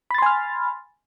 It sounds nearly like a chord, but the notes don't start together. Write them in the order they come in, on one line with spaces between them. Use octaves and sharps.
B5 A6 C6 G#5 F6